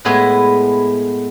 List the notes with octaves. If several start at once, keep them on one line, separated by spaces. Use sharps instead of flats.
A2 G#3 B3 E4 G#5